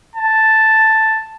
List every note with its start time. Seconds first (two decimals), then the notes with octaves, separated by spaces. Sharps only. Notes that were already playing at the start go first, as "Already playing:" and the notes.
0.16 A5